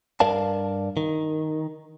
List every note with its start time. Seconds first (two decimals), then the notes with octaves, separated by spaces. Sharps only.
0.20 G2 A#4 D5 F5 A5
0.97 D#3